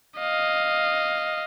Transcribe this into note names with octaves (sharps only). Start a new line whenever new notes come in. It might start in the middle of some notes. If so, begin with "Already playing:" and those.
D#5 F5